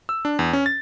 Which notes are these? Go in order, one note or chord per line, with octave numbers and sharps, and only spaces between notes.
E6
D4
E2
C#4
A6